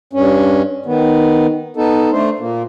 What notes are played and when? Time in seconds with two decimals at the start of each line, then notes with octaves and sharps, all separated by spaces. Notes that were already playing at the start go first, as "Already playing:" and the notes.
0.13 G2 C#4
0.86 D#3 B3
1.77 B3 D#4 A4
2.12 A3 D4 C5
2.39 A#2 A#3